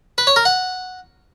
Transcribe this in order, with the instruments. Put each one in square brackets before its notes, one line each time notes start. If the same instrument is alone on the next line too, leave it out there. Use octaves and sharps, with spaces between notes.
[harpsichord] B4
C#5
A#4
F#5